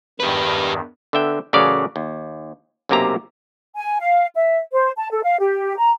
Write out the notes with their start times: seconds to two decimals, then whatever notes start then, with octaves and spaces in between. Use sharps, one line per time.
0.20 E2 G2 D#3 G4 B4
1.13 D3 B3 E5 G5
1.53 A1 C#3 F#3 A#4 D5 F5
1.96 D#2
2.89 B1 F#2 C3 A#3 G4 A#5
3.76 G#5
4.00 F5
4.35 E5
4.72 C5
4.97 A5
5.12 A4
5.24 F5
5.40 G4
5.77 A#5